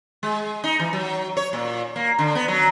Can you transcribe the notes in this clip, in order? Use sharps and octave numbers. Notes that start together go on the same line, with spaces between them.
G#3
D#4
E3
F#3
C#5
A#2
A#3
D3
B3
F#3